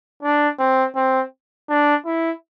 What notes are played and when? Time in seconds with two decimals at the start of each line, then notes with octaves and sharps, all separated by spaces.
0.23 D4
0.59 C4
0.95 C4
1.69 D4
2.06 E4